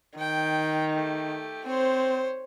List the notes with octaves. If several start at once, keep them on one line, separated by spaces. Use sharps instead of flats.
D#3 G5
A3 G4
C4 C5 C#5